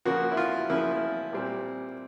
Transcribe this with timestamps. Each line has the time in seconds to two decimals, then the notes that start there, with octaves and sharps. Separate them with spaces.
0.05 C#3 F3 A#3 F#4
0.32 E4
0.37 F4
0.70 C#3 F3 A#3 E4
1.33 A#2 G3 C4